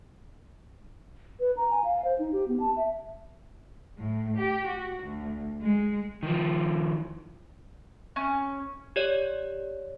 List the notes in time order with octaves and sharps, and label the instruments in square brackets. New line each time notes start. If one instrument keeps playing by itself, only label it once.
[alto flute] B4
A#5
G#5
F5
C5
D#4
G4
B3
A5
E5
[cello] A2
G4
F#4
D2
G#3
[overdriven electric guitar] D#3 F3
[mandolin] C#4
[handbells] G4 C#5 D5